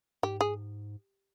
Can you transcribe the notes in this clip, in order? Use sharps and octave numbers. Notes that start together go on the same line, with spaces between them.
G#2 G4
G#4